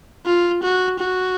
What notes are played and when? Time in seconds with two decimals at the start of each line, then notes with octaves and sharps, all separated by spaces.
0.26 F4
0.63 F#4
0.99 F#4